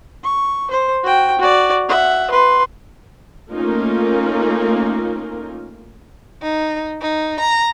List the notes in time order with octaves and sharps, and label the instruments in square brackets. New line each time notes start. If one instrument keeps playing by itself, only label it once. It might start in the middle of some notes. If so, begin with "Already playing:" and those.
[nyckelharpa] C#6
C5
F#4 G5
F#4 D5
E5 F#5
B4 C6
[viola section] A3 A#3 C#4 D#4 F4 A#4
[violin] D#4
D#4
A#5